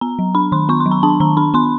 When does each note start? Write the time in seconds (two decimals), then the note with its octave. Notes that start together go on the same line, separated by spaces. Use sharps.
0.01 B3 A#5
0.19 F#3
0.35 D4 B5
0.52 D#3 C6
0.69 B3 C#6
0.80 C6
0.86 F#3
0.91 A#5
1.03 D4 A5
1.20 D#3 A#5
1.37 D4 B5
1.54 B3 C6